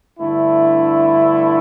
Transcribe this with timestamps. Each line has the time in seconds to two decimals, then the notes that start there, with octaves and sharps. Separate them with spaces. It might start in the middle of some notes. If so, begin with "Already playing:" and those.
0.19 G2 D3 A3 E4